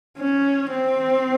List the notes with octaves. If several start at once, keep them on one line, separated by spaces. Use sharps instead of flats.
C#4
C4